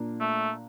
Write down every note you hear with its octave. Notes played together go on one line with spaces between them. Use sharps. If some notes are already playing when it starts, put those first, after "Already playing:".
Already playing: A#2 A#3 D4
A3